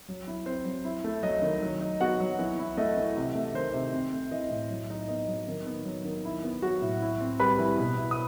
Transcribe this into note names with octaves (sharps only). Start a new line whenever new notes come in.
F#3
E4
C4 C5
F#3
E4
A3
F#3 D#5
D#3
F#3
D#4
B3 F#4 F#5
F#3
E3
E4
A3 D#5
E3
C3
A3
D#3 C5
C3
C4
A3
E3 D#5
A2
F#3
D#4
B3 D#5
F#3
D#3
B3
F#3
D#3
E4
B3
F#3 F#4 F#5
A2
E4
C4
G3 B4 B5
E3
B2
E4
D#6